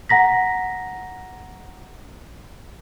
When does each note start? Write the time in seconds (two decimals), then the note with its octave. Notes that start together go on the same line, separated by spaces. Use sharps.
0.09 F#5 A#5 A#6 B6